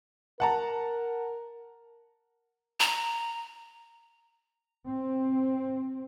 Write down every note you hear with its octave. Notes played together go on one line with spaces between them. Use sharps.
A#4 F#5 A5 A#5
A#5
C4